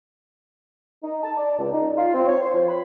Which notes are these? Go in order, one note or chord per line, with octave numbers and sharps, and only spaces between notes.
D#4
A5
D5
C#2
D#4
F4
C4
C#5
C5
F3
B5